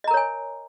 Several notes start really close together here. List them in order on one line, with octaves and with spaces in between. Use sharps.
D#5 A#5 A#4 C#5 G#5